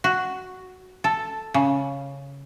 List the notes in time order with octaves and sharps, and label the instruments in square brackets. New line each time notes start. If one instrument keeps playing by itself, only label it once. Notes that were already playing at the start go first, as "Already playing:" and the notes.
[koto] F#4
A4
C#3